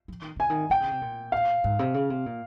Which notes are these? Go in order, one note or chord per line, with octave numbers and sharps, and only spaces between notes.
F3
D#3
C#3 G#5
D#3
D#3 G5
C#3
C3
A#2
F5
G#2
C3
C#3
C3
A#2